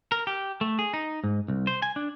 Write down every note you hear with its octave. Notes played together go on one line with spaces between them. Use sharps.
A#4
G4
A3
G#4
D#4
G#2
C2
C5
G#5
D4